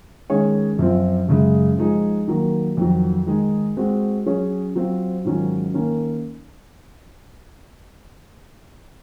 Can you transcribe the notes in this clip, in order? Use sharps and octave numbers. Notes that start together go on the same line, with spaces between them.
D#3 G#3 C#4 G#4 C#5
F#2 F3 C4 F4
F#2 C#3 G#3
F3 G#3 D#4 G#4
D#3 F#3 A#3
F2 D#3 F#3
D#3 G#3 D#4 G#4
G#3 C4 F#4
F#3 C#4 G#4 C#5
F#3 C4 F4 C5
G#2 D#3 F#3 C#4 F4
D#3 A#3 C#4